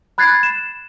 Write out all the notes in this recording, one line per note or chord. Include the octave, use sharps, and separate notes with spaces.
B5 F#6 G#6 A6 C7
E7